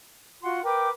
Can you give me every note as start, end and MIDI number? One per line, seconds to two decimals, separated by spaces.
0.43 0.60 65
0.43 0.60 66
0.43 0.60 78
0.43 0.60 84
0.64 0.90 70
0.64 0.91 71
0.64 0.89 79
0.64 0.91 86